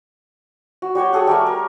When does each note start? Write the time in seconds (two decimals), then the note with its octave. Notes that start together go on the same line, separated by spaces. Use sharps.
0.82 F#4
0.95 G3 F#4 C#5 G5
1.13 F#4 G#4 A4 F#5
1.27 G3 A3 A#4
1.47 A#4